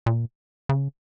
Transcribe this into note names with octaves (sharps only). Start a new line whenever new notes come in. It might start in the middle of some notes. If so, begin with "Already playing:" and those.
A#2
C#3